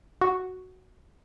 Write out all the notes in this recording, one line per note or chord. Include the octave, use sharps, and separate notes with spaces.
F#4